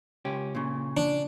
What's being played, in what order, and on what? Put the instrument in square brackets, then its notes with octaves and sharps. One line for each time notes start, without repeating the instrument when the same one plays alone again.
[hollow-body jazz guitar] C#2 C#4 G4
A#2 C#3
[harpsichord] D4